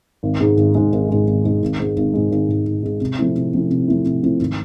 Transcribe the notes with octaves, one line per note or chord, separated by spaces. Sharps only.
G#1
G#2 G#3
G#1
G#2 G#3
G#1
G#2 G#3
G#1
G#2 G#3
G#1
G#2 G#3
G#1
G#2 G#3
G#1
G#2 G#3
G#1
G#2 G#3
C3
F3 A3 C4 E4
C3
F3 A3 C4 E4
C3
F3 A3 C4 E4
C3
F3 A3 C4 E4
G#1